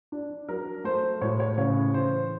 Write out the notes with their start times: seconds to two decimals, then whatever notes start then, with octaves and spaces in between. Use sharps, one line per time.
0.12 D4
0.49 F#3 A#4
0.84 A3 C5
1.21 A2 C#5
1.40 C#5
1.58 C#3 C#5
1.94 E3 C5